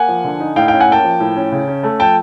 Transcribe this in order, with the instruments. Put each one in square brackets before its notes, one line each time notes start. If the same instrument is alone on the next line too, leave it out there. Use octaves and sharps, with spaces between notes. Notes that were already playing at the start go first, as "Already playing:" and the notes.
Already playing: [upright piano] A#3 F#5 G#5
F3
D3
D#4
A2 F5 G5
C#4 F5 G5
F#5 G#5
A#3 G5 A5
F3
A2
C#4
C#3
C#4
A3
F3 G5 A5